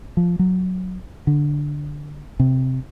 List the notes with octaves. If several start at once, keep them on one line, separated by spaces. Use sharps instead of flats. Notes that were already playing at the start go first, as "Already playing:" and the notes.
F3
F#3
D3
C3